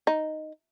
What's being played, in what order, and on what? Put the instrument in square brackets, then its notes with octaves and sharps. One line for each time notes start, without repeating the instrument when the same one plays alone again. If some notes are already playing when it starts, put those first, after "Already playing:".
[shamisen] D#4